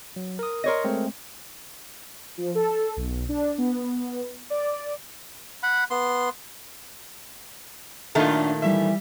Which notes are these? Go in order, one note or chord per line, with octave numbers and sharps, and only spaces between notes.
F#3
A#4 D#6
A#4 C#5 D#5 C6 A#6
G#3 A3 C4
F3
A4
B1
D4
B3
D5
F#5 B5
B3 C6
F#2 A#2 D#3 A3 D4 F4
E3 G3 E5